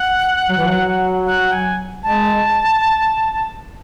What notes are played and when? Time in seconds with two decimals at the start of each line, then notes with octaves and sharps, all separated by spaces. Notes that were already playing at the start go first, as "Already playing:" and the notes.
Already playing: F#5
0.49 F#3
0.57 E3
0.66 F#3
1.26 F#5
1.52 G#5
2.03 G#3 A5